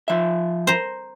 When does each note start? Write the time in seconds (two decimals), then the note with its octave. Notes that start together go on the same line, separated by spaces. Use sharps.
0.08 F3 E5
0.67 C5 A#5